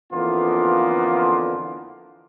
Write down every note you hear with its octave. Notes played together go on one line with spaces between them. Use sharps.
F2 D3 E3 A#3 B3 F4